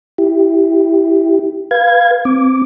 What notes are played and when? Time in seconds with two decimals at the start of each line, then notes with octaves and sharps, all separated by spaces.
0.18 E4 G4
1.71 B4 F5 G#6
2.25 C4 D6